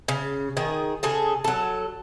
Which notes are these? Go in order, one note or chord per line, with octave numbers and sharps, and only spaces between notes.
C#3
D#3 G#4
C#3 G#4 A4
F#3 A4